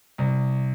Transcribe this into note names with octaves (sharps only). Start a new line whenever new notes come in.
C2